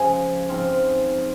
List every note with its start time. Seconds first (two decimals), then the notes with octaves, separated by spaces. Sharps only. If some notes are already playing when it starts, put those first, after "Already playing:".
Already playing: C#3 F3 G#3
0.49 G#2 F3 C4 F4